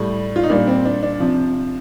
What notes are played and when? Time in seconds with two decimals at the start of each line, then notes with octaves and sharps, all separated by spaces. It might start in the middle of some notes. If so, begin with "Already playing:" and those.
Already playing: A2 G3
0.36 F4
0.43 D#4
0.50 A#2 G3 D4
0.67 C4
0.85 D4
1.03 D4
1.20 C3 F3